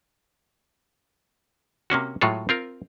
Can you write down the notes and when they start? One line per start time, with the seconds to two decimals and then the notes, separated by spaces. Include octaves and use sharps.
1.90 C3 A#3 C#4 F#4
2.21 A2 F#3 G#3 F4 A4
2.49 C4 F4 A#4